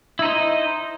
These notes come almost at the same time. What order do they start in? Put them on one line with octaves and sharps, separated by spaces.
E4 D#4 C5 D#5